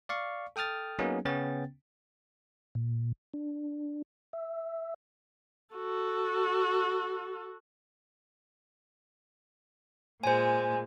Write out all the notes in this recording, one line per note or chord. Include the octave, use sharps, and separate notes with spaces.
D5 F5 C#6
A4 G5 D#6 F6 A6
F#3 A#3 B3 C#4 D#4 G#4
C#3 B3 C#4 G5 A6
A#2
D4
E5
F#4 A4
A#2 G#3 C5 G#5